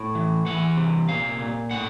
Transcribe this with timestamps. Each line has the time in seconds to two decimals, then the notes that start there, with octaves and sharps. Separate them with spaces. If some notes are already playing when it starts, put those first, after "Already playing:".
Already playing: A2
0.15 E3
0.46 E3 F#5
0.77 C3
1.09 A#2 F5
1.40 A#2
1.71 A2 F#5